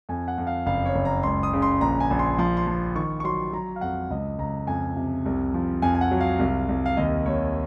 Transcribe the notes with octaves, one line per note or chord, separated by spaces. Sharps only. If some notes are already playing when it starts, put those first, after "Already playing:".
F2 G#5
F#5
F2
F5
F#1 F5
C#5
F#1
A#5
C#2 C6
D#6
C#3
C6
A#1 A#5
G#5
A#1
C6
F3 C6
C6
F3
D#3 C#6
C#6
F#3 C6
F#3 A#5
F5
F2 F#5
C#2 D#5
C#2 A#5
F2 G#5
C3
C2
F3
F2 G#5
G#5
F#5
F#3
F5
C2
C2
F5
D#2 D#5
D#2 C#5